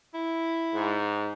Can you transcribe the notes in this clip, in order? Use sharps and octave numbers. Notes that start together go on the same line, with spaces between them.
E4
G#2